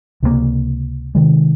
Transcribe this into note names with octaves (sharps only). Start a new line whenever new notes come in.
C#2 C3 F#3 A#3
C3 D#3 G#3